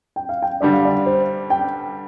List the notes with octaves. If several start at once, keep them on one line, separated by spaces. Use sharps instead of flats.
G5
F5
G5
G2 D3 G3 D5
F5
D5
C5
G5